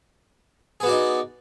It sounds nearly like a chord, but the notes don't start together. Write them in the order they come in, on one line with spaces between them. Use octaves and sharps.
G#4 B3 F#4 D5 D#4